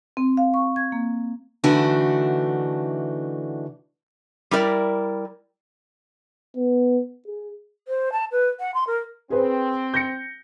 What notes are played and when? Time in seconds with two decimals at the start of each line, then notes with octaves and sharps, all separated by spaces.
0.17 C4
0.37 F5
0.54 C#6
0.76 G#6
0.92 A#3
1.64 D3 E3 A3 D4 D#4 F#4
4.51 G3 E4 A#4 D5
6.57 B3
7.27 G#4
7.88 C5
8.12 A5
8.32 B4
8.60 F#5
8.74 C6
8.87 A#4
9.30 C4 G#4 B4 C5
9.94 G6 A#6 C#7